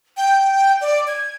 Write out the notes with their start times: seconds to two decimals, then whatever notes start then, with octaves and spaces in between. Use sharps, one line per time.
0.17 G5
0.81 D5
1.08 G#6